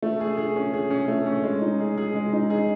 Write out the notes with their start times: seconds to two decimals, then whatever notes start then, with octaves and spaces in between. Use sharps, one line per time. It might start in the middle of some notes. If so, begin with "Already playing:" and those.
0.02 A3
0.20 G#4
0.37 G#4
0.56 C#4
0.73 G#4
0.90 C#4
1.08 A3
1.26 C#4
1.43 G#3
1.62 D#4
1.80 G#4
1.98 G#4
2.15 G#3
2.33 D#4
2.50 G#4